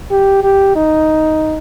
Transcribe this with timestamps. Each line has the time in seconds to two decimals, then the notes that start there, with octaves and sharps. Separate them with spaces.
0.11 G4
0.43 G4
0.76 D#4